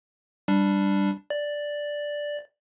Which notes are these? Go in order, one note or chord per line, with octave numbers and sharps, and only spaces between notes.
G3 D4
D5